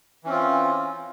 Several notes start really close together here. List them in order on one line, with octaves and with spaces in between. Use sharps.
E3 C#4 C4 F4